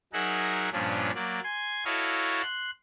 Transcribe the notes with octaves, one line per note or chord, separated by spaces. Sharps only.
F#3 D#4 G#4 A#4 E5 F#5
G2 A#2 F3 C#4 D4
F#3 A#3 D5
G#5 C6 G#6
E4 F#4 A4 C#5 D#5 F5
C6 F#6